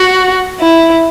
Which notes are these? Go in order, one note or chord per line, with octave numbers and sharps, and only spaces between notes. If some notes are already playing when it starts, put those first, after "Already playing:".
Already playing: F#4
E4